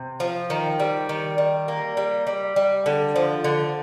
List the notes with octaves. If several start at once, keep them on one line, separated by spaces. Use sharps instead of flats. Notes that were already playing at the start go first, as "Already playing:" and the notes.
Already playing: C3
F3
D#3
G3
D#3
G3
A#3
G3
G3
G3
D3
F3
D3